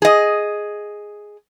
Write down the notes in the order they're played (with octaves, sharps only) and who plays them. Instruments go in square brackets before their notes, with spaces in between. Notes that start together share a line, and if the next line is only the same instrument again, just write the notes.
[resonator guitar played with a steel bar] G#4 D#5